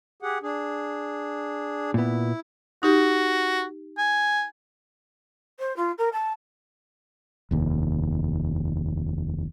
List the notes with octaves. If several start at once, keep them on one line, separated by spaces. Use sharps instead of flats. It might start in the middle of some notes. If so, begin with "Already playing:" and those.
G4 G#4 F#5
D4 G#4
A#2 B3 E4
D#4 F#4 G4
G#5
C5
F4
A#4
A5
F1 D#2